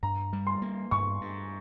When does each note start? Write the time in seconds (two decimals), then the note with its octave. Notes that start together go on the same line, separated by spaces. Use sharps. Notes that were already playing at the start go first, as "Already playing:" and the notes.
0.03 G2 A#5
0.33 G3
0.47 C6
0.62 A#3
0.91 G2 C#6
1.21 G2